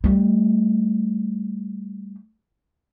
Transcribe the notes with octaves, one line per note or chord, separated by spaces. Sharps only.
G3 A3